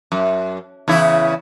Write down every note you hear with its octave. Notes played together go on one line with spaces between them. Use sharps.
F#2
E2 C#3 E4